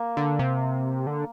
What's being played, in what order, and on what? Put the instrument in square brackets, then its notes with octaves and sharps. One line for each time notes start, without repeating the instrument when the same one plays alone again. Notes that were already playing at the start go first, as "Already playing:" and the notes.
Already playing: [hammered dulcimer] A#3
[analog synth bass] D3
C3
D3